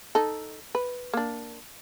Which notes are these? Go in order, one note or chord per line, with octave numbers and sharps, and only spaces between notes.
D#4 A4
B4
A#3 D4